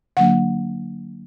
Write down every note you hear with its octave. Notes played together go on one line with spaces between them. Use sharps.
D3 F#3 A#3 D4 F#5